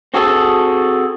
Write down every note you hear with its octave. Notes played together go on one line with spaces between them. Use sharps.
C4 F#4 G#4 A4